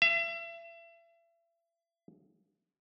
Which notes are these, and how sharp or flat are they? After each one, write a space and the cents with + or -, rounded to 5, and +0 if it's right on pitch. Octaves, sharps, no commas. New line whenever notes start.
E5 +35